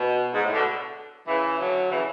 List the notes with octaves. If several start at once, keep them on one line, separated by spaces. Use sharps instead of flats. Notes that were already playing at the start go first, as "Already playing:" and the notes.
Already playing: B2
G#2
A2
B2 D3
C#3 E3
D3 F#3
C#3 E3